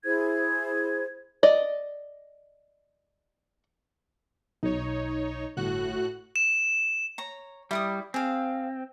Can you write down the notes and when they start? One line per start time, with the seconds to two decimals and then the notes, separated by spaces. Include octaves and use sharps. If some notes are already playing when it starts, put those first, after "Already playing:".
0.05 E4 G#4 C5 G#6
1.43 D5 D#5
4.63 B1 D#4 C#5
5.57 G1 A2 F#4 F#6
6.36 E7
7.18 C#5 A#5
7.71 G3 E4 D5 D#6
8.14 C4 G#4 F5